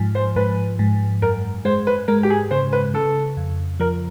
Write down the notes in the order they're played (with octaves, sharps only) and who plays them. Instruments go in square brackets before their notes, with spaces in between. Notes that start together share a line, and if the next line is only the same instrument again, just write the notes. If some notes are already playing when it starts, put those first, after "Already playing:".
Already playing: [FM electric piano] G#2 F3
[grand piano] C5
[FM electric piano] G#2 [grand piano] B4
[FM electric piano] G#2
[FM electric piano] F#2 [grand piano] A#4
[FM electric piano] G#3 [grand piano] C5
[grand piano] B4
[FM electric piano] G#3 [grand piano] A#4
[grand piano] G4
G#4
[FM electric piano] C#3 [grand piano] C5
[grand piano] B4
[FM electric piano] C#3 [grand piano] A4
[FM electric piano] F2
[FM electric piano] F3 [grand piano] A#4